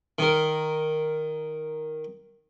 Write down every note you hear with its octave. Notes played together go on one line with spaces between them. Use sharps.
D#3 A#4